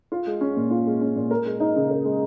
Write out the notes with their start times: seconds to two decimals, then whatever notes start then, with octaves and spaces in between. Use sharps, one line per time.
0.12 F4
0.27 G#3
0.41 C#4
0.56 A#2
0.71 F4
0.86 G#3
1.01 C#4
1.16 A#2
1.31 A#4
1.46 G#3
1.60 D#4
1.76 C#3
1.90 A#4
2.05 G#3